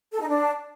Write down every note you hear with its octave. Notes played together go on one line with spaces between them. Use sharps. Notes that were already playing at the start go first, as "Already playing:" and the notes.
A4
D#4
D4